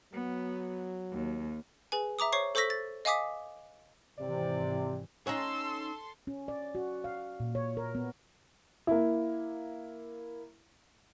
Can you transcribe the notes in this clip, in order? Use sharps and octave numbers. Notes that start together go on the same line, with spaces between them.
F#3 B3
D#2
G#4 B4 G#5
E5 A#5 D6 D#6
C5 C#5 C#6 C7
A4 C5 C#6 E6 A#6 B6
A6
D#5 F5 G#5 D6 D#6 B6
G#1 G#2 C3 E3 D5
C#4 D#4 A4 C#5 F#5 A#5 C6 E6
C#4
D5
F#4
F5
A#2
C#5
A#4
B3
A#3 E4